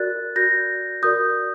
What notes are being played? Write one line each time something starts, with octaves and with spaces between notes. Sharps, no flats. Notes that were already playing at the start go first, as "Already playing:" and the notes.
Already playing: F#4 A#4 D5 F#6 A6
F#4 A#4 D5 G6 A#6
F#4 A#4 D5 D#6 G6